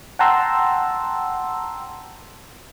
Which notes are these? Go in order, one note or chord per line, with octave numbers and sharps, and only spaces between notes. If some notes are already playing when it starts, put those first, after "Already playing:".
F#5 G5 A5 A#5 C6 E6